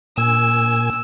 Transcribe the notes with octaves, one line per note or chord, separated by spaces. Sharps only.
A#2 G#5 E6